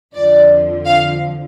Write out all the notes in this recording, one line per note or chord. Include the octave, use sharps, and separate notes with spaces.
F2 D3 F3 D5
F5